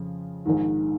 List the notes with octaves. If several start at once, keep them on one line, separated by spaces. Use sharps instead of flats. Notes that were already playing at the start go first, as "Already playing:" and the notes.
Already playing: F2 C#3 F3
A#1 G#2 D#3